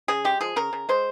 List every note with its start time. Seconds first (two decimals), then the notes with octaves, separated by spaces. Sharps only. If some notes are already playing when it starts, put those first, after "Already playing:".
0.08 C#3 G#4
0.25 G#3 G4
0.41 F3 G#4
0.56 C#3 A#4
0.73 C#3
0.89 G#3 C5